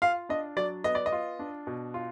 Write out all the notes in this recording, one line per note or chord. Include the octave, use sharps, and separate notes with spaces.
F4 F5
D4 D#5
F#3 D5
B3 D#5
D5
D#5
F4
D4
B2
F4